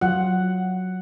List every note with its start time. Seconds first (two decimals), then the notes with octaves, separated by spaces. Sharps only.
0.01 F#3 F4 F#5